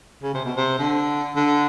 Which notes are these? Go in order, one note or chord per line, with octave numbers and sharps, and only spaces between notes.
C#3
C3
B2
C3
D3
D3